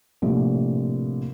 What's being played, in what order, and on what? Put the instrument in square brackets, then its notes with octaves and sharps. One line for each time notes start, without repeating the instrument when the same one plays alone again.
[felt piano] A#1 A2 C3